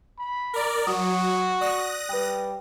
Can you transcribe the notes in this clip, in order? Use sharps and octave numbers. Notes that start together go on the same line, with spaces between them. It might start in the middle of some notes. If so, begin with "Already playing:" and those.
B5
A#4 D5
F#3 F#4 D#6
D5 D#6 F#6 A#6
G3 B4 G5